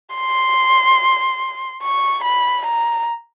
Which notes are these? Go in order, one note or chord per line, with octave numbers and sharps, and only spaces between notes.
C6
C#6
B5
A#5